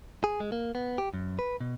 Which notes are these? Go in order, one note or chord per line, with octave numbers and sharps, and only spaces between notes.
G#4
G#3
A#3
B3
G4
F#2
B4
B2